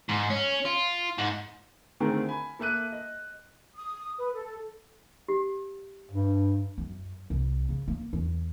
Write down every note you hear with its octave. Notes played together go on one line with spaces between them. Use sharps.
G#2
C#4
F4
G#2
D3 D#3 A3 C4 G#4 A#4
G#5 B5
A#3 A4 E5 F#6 D#7
D#5
D#6
B4
A4
G4
G2
F#2
C2
C#3
A#3
E2